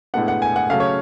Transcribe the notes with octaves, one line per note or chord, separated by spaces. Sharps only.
A2 G#3 B3 D4 F#5
F#5
G#5
F#5
C#3 F#3 A3 C#4 F5
C#5